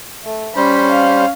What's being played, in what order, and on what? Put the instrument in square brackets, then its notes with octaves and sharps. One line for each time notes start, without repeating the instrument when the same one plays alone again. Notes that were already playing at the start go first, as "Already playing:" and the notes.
[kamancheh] A3
[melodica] G3 C5 [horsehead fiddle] C#4 [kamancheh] B5
[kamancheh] F5